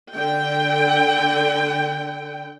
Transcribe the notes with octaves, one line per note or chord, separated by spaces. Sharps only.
D3 G5